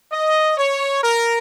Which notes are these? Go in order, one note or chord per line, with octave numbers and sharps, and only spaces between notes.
D#5
C#5
A#4